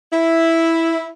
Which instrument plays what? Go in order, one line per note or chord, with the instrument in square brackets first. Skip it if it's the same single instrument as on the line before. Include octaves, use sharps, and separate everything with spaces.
[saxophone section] E4